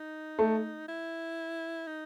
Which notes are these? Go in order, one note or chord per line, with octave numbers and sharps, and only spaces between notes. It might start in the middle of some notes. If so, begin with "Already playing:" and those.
Already playing: D#4
A3
E4
D#4